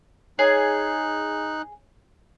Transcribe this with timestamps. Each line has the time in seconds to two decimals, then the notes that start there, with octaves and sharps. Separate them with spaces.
0.39 D#4 G#4 C#5 F#6